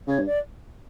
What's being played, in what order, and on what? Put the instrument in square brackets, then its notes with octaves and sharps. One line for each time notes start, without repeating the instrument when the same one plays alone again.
[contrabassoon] C#3 [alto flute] C#5
[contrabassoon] G2
[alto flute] D5